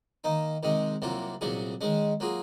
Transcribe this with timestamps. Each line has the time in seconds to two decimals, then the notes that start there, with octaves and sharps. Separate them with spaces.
0.24 D#3 A#3 D#4
0.63 C3 D#3 G#3 D#4
1.02 C2 C3 F#3 A#3 F4
1.41 C2 A#2 F#3 C#4 G#4
1.81 D#3 G#3 C#4
2.20 F#3 A#3 F4 G#4